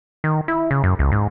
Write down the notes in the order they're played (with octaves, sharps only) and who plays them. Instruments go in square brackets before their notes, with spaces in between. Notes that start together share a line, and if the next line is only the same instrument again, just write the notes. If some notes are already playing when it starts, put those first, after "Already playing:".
[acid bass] D#3
E4
C#3
F#2
C#2
G#2